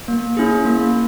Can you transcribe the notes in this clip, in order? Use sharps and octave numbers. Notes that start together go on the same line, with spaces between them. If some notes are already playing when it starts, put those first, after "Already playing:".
A#3
C#4 E4 G#4
A#3